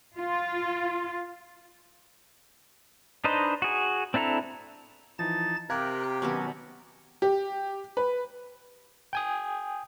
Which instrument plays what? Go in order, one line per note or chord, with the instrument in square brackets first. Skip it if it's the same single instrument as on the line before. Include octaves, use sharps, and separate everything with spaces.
[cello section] F4
[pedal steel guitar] D4 D#4 B4 C5 D#5
F#4 G#4
C4 D4 E4 A4 A#5
[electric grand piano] E3 F3 [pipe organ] D#4 A5 A6
[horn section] C3 G4 [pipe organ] A#4 F#6 [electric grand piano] F5 A#5 G#6
[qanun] B2 D#3 B3 [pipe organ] F#3 C#4 F#4
[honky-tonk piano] G4
B4
[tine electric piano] G5 G#5 D#6